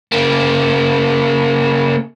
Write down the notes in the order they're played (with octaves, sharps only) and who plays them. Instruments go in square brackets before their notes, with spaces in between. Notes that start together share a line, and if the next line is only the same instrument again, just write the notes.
[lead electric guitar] C#3 A#3